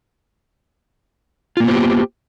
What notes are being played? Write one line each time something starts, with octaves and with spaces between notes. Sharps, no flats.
A#3 B3 F4 G4 C5